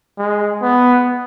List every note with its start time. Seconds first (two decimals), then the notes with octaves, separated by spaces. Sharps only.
0.18 G#3
0.62 B3